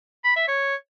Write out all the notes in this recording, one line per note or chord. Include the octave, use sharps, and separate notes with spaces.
B5
E5
C#5